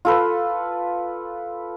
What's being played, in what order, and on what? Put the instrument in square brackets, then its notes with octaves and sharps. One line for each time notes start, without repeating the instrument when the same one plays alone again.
[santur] F4 A4 B4